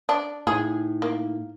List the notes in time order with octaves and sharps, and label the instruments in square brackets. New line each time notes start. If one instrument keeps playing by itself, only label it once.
[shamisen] D4
[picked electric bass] A2 [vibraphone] D#4 [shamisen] G#4
[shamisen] A#3